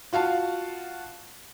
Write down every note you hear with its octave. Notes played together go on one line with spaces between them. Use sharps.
F4 F#4 F5 A5